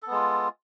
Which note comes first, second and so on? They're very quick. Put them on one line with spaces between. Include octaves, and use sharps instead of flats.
A4 B3 G#3 F4